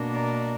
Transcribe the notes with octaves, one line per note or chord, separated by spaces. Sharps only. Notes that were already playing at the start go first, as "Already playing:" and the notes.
Already playing: B2 A#3 D4
A#4 D5